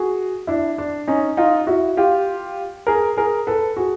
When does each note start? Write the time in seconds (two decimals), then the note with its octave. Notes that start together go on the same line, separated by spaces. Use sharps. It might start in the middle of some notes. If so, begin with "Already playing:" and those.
Already playing: F#4 G#4
0.47 D4 E4
0.78 D4
1.07 C#4 D#4
1.37 D#4 F4
1.67 E4 F#4
1.97 F4 G4
2.87 G#4 A#4
3.17 G#4 A#4
3.47 A4 B4
3.77 F#4 G#4